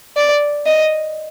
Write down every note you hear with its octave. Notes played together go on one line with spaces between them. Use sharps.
D5
D#5